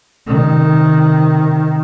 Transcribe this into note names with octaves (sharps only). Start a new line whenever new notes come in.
C3 D#3